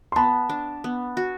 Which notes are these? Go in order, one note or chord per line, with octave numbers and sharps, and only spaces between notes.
C6
B3 A5 B5
D4
B3
F#4